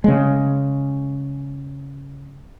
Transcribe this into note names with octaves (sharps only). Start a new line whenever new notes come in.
C#3 G#3